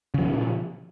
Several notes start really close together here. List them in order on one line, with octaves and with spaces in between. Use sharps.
C#3 F3 A#2